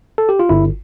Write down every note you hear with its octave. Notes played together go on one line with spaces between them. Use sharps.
A4
G4
F4
G1 E4